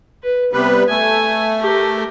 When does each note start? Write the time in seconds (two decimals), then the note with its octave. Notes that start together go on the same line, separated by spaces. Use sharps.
0.23 B4
0.53 C3 G3 B3 B4
0.89 A3 G#5
1.60 G4 A#4